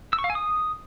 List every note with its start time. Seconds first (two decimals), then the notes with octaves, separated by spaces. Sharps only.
0.13 E6
0.19 C#6
0.24 F5
0.30 G#5
0.35 D#6